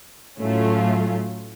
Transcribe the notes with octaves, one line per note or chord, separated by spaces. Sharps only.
A2 F#3 A3 C#4 F4